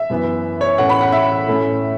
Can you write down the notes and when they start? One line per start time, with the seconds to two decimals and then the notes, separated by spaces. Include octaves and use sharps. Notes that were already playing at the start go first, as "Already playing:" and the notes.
Already playing: E5
0.10 F#2 E3 B3
0.61 C#5
0.78 A2 E3 C#4 F#5
0.89 B5
1.01 F#5
1.12 E5
1.47 A2 A3 C#4